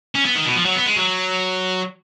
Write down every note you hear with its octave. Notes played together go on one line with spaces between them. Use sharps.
C#4
B3
D#3
B2
F3
F#3
B3
G#3
F#3